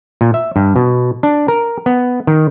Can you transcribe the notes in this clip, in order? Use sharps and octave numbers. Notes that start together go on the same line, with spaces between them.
A#2
E5
G2
B2
D4
A#4
B3
D#3